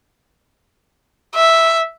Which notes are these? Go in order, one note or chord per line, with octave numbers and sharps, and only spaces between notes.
E5